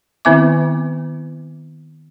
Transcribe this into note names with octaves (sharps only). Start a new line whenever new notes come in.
D#3 B3 C4 E4 E5 D6